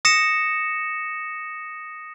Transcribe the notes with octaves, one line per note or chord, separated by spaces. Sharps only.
D#6 A#6 C#7 E7